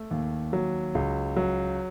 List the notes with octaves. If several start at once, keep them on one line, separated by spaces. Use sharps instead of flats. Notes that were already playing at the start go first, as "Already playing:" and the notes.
Already playing: A3
D#2
F#3
C#2
F#3